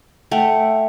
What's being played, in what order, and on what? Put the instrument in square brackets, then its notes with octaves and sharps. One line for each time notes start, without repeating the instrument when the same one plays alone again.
[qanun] A3 [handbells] E5 F#5 G5